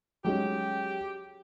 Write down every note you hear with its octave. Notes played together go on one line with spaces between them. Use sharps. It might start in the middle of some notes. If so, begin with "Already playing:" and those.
F#3 G#3 C#4 G4